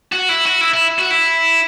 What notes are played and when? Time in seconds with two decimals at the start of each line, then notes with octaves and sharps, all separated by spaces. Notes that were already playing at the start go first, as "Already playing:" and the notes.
0.12 F#4
0.29 E4
0.45 F#4
0.61 E4
0.74 E4
0.99 F#4
1.10 E4